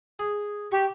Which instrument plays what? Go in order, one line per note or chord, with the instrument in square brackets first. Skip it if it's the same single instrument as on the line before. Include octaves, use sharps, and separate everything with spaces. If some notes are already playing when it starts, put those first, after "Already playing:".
[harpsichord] G#4
[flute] G4 [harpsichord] C#6